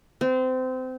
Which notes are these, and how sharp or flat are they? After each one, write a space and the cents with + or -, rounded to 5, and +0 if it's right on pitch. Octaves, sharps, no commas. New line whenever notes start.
C4 -25